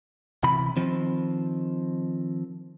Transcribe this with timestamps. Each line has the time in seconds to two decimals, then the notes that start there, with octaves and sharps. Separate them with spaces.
0.44 C3 E3 B5
0.77 D#3 F3 C4